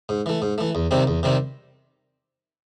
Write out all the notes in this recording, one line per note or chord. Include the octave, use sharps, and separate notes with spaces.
G#2
E3 A3
G#2
E3 A3
E2
C3 D#3 G3 C4
E2
C3 D#3 G3 C4